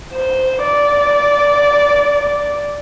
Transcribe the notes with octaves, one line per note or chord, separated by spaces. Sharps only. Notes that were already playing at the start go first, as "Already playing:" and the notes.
C5
D5